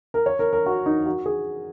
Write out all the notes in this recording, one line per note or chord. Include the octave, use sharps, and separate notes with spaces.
A#4
C#5
A#4
A#4
F#4
D#4
F#4
G#4